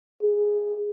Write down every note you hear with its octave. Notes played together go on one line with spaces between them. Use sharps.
G#4